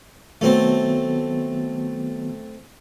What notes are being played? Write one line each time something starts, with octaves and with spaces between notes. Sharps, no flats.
D#3 F#3 A3 B3 C4